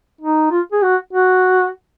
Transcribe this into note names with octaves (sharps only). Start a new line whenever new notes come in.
D#4
F4
G#4
F#4
F#4